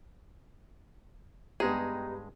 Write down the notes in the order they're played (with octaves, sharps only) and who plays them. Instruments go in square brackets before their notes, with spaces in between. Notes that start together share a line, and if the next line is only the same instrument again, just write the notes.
[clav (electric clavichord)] G2 G#3 G#4 [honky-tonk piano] B3 G4 [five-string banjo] D#4